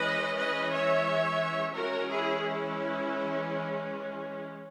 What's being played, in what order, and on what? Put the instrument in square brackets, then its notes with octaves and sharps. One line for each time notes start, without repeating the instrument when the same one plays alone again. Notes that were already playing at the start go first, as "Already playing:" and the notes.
Already playing: [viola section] E3 G#3 C#4 B4 D#5
B4 D#5
C#5 E5
E3 G#3 C#4 F#4 A#4
E4 G#4
E4